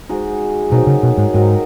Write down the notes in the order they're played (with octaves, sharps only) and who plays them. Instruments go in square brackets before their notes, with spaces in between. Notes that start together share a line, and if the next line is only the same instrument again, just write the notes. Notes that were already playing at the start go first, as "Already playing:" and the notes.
[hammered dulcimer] G#3 D#4 F#4
[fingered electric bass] B2 [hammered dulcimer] D#3 F#3 D#4
[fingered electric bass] C#3
B2
G#2
[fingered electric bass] G#2 [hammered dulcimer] D#3 F#3 D#4